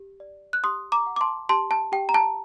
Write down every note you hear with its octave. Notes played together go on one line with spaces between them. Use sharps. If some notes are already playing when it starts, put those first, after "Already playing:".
Already playing: G4
D5
F#6
G4 C6 D#6
A#5 D6
F#5
D6
A5 C6
G4 A5 C6
A5
G4 G5
A#5
A5